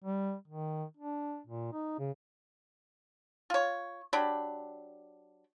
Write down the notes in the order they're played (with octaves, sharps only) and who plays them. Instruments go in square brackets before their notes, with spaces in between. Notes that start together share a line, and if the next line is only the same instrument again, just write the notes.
[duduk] G3
D#3
D4
A#2
D#4
C#3
[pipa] F4 C#5
F#3 D4 G4 B5